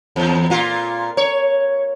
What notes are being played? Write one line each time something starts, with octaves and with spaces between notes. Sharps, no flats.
E2
A#2 F4
C#5